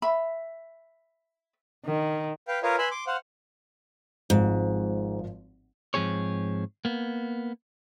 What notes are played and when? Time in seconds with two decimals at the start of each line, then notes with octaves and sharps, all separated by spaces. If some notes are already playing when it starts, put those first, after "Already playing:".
0.02 E5 B5
1.85 D#3
2.48 B4 F5 G5
2.63 F4 A#4 B4 C#5 D#5 F5
2.78 B4 G#5 B5 C6 E6
2.91 C6 D6
3.07 C5 F5 F#5
4.30 G#1 G#2 F3
5.94 G#2 F3 C4 G#4 C#5
6.85 A#3 B3